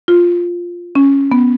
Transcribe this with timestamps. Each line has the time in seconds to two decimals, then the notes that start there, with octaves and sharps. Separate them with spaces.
0.08 F4
0.95 C#4
1.32 B3